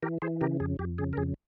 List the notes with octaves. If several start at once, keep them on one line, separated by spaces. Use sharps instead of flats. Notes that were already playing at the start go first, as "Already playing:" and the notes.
E3 G4 A#4
E3 G#4 C5
C#3 G4 A#4
F2 G#4
F2 G4
C#3 G#4
A#4
F2 G#4